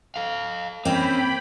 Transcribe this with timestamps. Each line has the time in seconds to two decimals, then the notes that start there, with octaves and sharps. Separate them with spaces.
0.16 A4 F5
0.85 A#3 C4 C#4 G5 B5